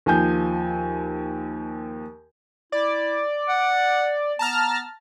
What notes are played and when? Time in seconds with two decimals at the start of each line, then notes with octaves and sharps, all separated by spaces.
0.06 D#2 F3 G#5 G6
2.72 E4 D5
3.49 F#5
4.39 B3 A5 A#5 F6